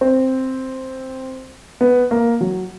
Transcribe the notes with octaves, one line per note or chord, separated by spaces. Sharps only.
C4
B3
A#3
F#3